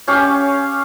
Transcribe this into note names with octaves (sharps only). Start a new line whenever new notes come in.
C#4 G4 F5 C#6